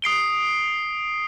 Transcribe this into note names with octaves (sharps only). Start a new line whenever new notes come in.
D#6 C7 D7 G7